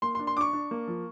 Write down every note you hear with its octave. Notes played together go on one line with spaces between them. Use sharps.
A#3 C6
C6
D4
C6
D4 C#6 D6
D4
A#3
F3